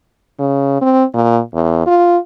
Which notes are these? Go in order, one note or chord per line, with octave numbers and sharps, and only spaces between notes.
C#3
C4
A#2
E2
F4